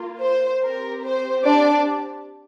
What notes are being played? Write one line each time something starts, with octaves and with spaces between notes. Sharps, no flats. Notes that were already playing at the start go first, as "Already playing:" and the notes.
Already playing: A#3 F4
C5
C4 G4 A#4
C5
D4 D5